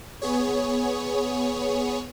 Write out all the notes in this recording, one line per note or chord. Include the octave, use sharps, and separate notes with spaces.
B3 G#4 C#5